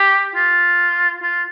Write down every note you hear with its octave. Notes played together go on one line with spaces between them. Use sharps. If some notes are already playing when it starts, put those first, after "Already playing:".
Already playing: G4
F4
F4